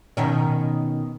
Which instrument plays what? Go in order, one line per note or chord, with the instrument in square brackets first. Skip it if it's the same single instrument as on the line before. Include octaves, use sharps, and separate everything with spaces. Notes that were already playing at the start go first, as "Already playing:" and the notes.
[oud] B2 D#3 C#4